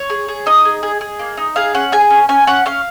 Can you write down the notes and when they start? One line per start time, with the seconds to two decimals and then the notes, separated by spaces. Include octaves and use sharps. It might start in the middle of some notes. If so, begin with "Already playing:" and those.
Already playing: C#5
0.10 G#4
0.28 G#4
0.46 D#4 D#5
0.65 G#4
0.83 G#4
1.01 G#4
1.19 A#3
1.37 D#4
1.56 G#4 F5
1.74 C#4 F#5
1.92 G#4 G#5
2.10 C#4
2.29 C#4 G#5
2.47 C#4 F#5
2.66 C#4 F5